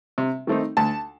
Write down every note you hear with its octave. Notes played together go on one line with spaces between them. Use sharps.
C3
D#3 A3 C4 D#4
D2 A5